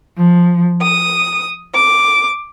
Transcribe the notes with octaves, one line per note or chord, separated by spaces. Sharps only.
F3
D#6
D6